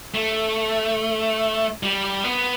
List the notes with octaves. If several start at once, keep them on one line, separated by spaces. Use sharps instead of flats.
A3
G3
B3